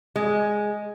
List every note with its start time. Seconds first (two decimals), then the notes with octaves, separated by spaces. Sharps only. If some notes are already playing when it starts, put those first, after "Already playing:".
0.16 G#3